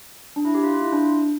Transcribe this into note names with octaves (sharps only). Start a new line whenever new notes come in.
D4
E4
G4
F4
F4
E4
D4